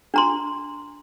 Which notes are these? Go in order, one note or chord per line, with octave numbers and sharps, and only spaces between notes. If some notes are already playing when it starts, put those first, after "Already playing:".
D4 A#5 C6